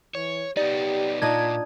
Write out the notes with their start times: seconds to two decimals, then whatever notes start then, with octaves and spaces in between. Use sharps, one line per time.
0.15 E3 C#5
0.57 B3 D#4 G4 D5
1.22 A#2 D4 D#4 F4 D#5 G#6